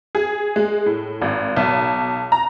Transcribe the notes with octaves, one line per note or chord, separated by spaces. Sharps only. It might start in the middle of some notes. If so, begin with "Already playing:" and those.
G#4
G#3
A2
G#1
B1
A#5